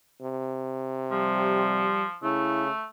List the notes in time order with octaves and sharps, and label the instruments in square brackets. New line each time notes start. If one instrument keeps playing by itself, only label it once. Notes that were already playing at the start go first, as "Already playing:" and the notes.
[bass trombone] C3
[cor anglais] F3 [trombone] G3
[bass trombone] C#3 [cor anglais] A3 [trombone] E4